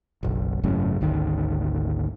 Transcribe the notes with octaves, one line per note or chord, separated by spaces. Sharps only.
F#1 B1
G#1 F#2 A2 C#3
G#1 D2 D#3